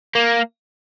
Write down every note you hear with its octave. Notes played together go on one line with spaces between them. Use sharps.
A#3